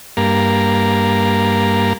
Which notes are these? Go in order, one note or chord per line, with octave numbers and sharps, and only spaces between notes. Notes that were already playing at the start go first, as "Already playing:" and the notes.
G2 A#3